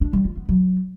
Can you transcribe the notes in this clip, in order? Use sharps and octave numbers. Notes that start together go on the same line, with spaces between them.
D4
G3
F4
B3
F#3